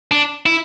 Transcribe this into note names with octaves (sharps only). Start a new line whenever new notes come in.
D4
E4